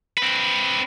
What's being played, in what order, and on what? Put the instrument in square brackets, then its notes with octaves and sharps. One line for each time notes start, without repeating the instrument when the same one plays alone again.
[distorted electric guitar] C4 B4